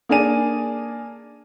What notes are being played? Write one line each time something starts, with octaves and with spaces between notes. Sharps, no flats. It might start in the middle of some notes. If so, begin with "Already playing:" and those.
A#3 D4 G#4 D5 G#5 D#7